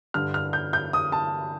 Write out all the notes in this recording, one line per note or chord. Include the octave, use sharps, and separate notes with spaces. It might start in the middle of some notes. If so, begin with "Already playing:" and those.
G2 D3 F6
F6
G6
G6
D#6
A5